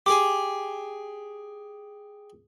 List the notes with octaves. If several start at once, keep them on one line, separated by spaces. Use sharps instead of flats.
G4 G#4 D6